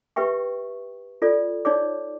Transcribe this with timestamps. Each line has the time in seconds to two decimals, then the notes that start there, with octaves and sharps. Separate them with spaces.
0.16 G4 B4 E5 G5 C#6
1.22 F4 A4 D5
1.65 D#4 C#5 D5 D6